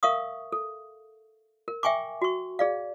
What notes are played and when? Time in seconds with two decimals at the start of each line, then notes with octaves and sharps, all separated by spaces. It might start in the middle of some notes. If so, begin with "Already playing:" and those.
0.03 A#4 E5 F5 C#6 D#6
0.52 A4
1.68 A#4
1.83 E5 G5 G#5 C#6 D6
2.22 F#4 C#6
2.59 G#4 D5 F5